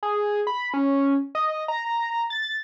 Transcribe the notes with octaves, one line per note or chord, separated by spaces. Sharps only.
G#4
B5
C#4
D#5
A#5
A6